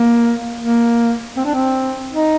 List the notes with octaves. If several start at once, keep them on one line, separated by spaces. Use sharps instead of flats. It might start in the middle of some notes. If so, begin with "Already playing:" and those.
Already playing: A#3
A#3
C4
D4
C4
D#4